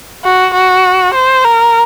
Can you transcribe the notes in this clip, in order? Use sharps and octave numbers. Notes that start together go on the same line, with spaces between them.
F#4
F#4
C5
A#4